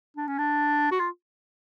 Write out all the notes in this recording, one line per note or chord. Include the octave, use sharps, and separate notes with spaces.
D4
C#4
D4
F#4
F4